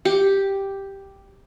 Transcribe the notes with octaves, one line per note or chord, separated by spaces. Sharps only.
G4